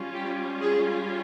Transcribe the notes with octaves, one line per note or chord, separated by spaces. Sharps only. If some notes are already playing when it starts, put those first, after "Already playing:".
Already playing: G3 C#4 F4
G4
G#4